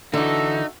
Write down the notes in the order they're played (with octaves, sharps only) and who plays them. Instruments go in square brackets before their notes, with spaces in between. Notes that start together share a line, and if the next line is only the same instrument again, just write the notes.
[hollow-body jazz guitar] D3 E3 [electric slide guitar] D#4 [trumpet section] F#4 A4 E5